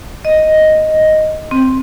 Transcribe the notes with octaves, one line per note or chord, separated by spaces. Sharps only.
D#5
C4